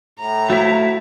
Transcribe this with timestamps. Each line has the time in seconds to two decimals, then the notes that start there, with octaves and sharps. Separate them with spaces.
0.19 A2 A#5
0.50 A3 E4 F#4 C5 F5